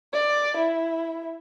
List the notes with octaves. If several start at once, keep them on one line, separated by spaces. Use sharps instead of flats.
D5
E4